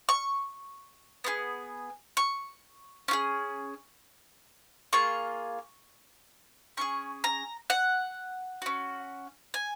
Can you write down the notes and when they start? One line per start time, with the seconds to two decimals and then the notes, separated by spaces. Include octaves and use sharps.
0.09 C#6
1.24 B3 F4 G#4
2.17 C#6
3.08 C#4 F4 G#4
4.93 A#3 F4 G#4 C#6
6.77 C#4 F4 G#4 C#6
7.24 A#5
7.70 F#5
8.62 C#4 F#4
9.54 G#5